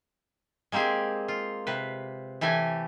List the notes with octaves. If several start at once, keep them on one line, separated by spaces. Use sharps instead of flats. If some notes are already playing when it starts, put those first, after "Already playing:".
G#3 A#3 C4 G4 G#4
F4
C3 B4
E3 A3 G4 G#5